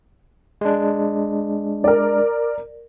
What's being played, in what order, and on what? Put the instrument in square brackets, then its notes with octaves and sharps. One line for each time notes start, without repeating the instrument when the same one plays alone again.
[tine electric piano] G#3 D4
[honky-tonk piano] A#4 D5